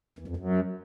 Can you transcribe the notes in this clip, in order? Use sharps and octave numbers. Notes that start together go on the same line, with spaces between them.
E2
F2
F#2